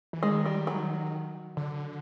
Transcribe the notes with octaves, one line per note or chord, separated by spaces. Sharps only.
E3
D#3 G#3
G3
F#3
D3